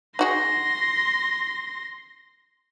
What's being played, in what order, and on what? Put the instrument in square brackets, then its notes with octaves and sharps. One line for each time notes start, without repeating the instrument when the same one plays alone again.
[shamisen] D#4 F#4 G#4 [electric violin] C6 A#6